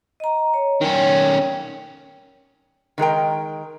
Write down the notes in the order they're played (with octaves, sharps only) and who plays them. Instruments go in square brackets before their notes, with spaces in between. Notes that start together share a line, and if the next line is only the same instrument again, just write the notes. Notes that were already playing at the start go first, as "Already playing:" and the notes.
[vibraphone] D#5 A#5
C#5
[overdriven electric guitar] D#3 C#4 [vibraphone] G5
[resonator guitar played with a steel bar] D#3 G#3 A#4 G5